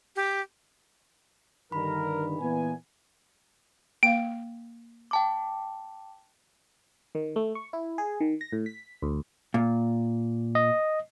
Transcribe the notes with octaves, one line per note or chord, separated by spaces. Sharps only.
G4
G2 D3 D#3 A#4 B5
A#2 E3 B3 G#5
A#3 F5 D7
G5 A5 D6
D#3
A3
C#6
E4
G#4
D#3
A#6
A2
B6
D2
A#2
D#5